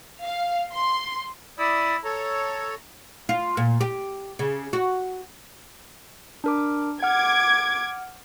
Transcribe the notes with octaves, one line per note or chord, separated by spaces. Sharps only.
F5
C6
E4 D5 D#6
A4 C#5 A#5
F4
A#2
G4
C#3
F#4
D4 A#4 D6
F#5 D6 F6 G#6